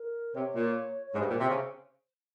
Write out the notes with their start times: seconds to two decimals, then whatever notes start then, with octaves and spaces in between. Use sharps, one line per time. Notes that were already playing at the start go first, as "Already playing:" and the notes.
Already playing: A#4
0.35 C3 C#5
0.55 A#2
1.07 C#5
1.13 G#2
1.18 G2 C5
1.29 A#2
1.39 C3
1.50 C#3